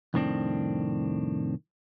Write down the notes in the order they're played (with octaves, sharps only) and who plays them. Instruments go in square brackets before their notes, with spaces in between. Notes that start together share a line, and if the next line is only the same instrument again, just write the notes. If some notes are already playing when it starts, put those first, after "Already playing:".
[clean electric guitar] C2 F2 A2 D#3 C4 D4